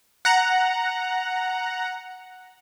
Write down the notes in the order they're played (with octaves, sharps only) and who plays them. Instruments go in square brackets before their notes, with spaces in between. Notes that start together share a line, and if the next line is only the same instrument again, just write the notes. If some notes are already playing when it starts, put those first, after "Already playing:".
[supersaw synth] F#5 A#5